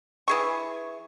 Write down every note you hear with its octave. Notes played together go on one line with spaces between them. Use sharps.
E3 G#4 C#6